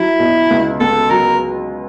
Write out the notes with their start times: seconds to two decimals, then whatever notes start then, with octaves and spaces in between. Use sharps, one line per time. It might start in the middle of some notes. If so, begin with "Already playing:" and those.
Already playing: F#3 E4
0.20 B2
0.50 C#2
0.80 C#2 A4
1.10 F#3 A#4